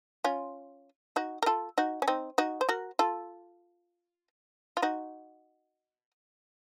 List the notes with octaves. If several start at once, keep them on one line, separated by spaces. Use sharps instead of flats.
C#4 F4
D#4 F#4
A#4
F4 A4
D#4 F#4
C#4
C4 D#4
D#4 F#4
C5
F#4 A#4
F4 A4
F4
D#4 F#4